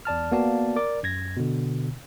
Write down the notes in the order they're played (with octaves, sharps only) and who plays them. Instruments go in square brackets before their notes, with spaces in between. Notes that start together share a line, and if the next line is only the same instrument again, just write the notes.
[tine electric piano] E2 D5 A5 F6
A#3 B3 F#4 D5 F5 A5
A#4 D5 D6
F#2 G#6 A#6
B2 D3